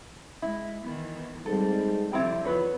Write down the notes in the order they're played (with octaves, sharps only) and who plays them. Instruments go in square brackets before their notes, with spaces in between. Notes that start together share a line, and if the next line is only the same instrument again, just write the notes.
[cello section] G#3 [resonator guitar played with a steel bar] E4
[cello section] D#3 E3 B3
[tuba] G#2 [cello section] G3 C4 [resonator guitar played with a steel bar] A4
[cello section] F2 D3 [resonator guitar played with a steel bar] G3 C4 E4
[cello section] E2 B3 [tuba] F3 [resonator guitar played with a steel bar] F#3 B4 C#5